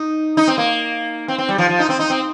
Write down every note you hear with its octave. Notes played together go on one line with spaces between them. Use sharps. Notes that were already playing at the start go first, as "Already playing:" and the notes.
Already playing: D#4
D#4
C4
A#3
C4
C4
G3
F3
F3
D#4
C4
D#4
C4